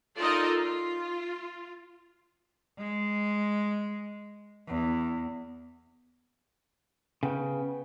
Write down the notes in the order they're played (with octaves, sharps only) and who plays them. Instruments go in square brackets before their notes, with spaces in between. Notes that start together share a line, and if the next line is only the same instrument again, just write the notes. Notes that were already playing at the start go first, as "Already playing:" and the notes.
[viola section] D#4 F4 A4 A#4 D5 D#5
F4
[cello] G#3
E2
[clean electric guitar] C#3 [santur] B3 G5 C#6